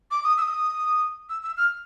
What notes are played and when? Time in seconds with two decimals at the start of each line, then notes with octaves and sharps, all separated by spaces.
0.11 D6
0.24 D#6
0.38 E6
0.42 D#6
1.30 E6
1.43 E6
1.57 F6